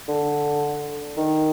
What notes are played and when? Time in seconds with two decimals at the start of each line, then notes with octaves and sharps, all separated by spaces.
0.08 D3
1.17 D#3